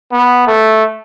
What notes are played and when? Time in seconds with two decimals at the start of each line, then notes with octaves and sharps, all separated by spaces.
0.12 B3
0.47 A3